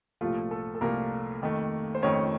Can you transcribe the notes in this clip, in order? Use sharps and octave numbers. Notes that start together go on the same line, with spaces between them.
C2 A#2 F3 A3 F4
A3 A4
A4
C2 A#2 F3 A3 A#3 A#4
F2 D#3 A3
C5
F2 D#3 A3 C#4 C#5